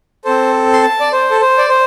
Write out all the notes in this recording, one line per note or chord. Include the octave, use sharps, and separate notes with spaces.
C4 A4 C5
C6
A5
D5
C5
A4
C5
D5
C5